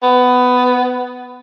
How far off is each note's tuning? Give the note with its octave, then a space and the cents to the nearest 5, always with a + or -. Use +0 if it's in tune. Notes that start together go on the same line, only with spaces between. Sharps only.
B3 +15